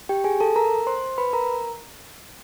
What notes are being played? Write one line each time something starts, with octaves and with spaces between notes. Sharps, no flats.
G4 G5
G#4 G#5
A4 A5
A#4 A#5
C5 C6
B4 B5
A#4 A#5